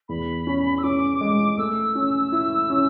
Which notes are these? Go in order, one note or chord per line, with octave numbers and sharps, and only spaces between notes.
E2 B5
C#4
E6
C#4 D6
G#3
A3 E6
C#4
E4
C#4